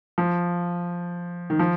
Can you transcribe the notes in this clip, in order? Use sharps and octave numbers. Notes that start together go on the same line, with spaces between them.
F3
D#3
F3